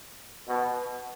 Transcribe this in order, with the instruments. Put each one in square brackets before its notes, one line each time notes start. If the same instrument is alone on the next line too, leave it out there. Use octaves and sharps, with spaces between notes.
[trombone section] B2